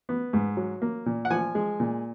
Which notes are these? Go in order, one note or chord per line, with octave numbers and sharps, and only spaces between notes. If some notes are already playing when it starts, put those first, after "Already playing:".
B3
G#2
F#3
A#3
A#2
F#5
F3 G#5
G#3
A#2